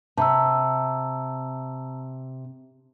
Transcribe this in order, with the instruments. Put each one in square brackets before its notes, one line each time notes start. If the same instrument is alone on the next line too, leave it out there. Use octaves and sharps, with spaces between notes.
[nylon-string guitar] C3 [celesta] A5 A#5 E6